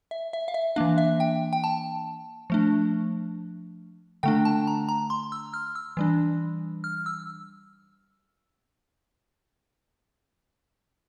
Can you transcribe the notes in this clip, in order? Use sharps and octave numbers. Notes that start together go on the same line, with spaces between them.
E5
E5
F5
E5
E3 A#3 D4 F5
E5
G5
G5
A5
F3 A3 D4
D3 A3 D4 G5
A5
A#5
A#5
C6
E6
F6
E6
E3 G3 D4
F6
E6